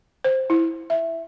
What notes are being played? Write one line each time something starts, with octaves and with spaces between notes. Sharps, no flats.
C5
E4
E5